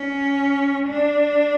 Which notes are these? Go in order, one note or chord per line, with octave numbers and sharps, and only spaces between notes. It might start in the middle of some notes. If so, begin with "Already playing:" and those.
Already playing: C#4
D4